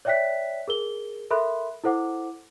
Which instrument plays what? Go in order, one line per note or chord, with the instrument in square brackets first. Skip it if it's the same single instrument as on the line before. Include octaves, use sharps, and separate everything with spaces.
[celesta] C#5 D5 E5 G5 F#6 B6
G#4 A#4 G7
A4 A#4 E5 B5 C6 F#6
E4 A4 C5 F#5 D6